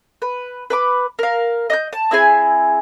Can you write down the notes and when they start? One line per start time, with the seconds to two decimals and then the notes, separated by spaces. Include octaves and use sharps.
0.22 B4
0.70 B4 B5 D6
1.19 A#4 F5
1.70 D#5 D#6 G6
1.93 A5
2.11 C4 E4 G#4 G#5